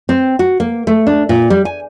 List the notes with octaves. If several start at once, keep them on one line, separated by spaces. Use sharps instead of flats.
C4
F#4
A#3
A3
D4
A#2
G3
G#5